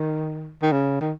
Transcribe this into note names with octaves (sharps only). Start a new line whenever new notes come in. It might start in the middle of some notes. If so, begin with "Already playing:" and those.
Already playing: D#3
D#3
C#3
D#3